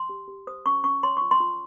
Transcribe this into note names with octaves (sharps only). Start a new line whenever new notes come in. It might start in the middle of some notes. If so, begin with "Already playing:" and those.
Already playing: C6
G4
G4
C5 D#6
C#4 C#6
C#4 C#6
C#5 C6
F4 C#6
C6
F4